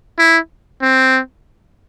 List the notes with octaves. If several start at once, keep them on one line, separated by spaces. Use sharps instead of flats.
E4
C4